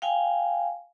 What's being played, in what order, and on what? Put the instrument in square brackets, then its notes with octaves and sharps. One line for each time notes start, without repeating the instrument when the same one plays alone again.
[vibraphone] F5 G5 G#5